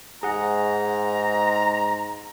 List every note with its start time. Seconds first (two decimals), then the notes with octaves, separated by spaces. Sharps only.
0.23 G#2 G#4 F#5 A#5